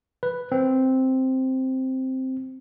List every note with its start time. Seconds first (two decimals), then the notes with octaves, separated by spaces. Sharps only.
0.23 B4
0.52 C4